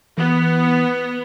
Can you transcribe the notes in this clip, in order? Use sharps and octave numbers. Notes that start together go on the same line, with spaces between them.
E3 B3